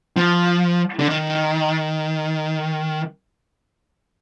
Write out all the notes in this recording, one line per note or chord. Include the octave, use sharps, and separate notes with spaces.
F3
D3
D#3